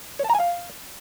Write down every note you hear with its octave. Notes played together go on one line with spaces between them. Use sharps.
C#5
A5
A#5
G#5
F5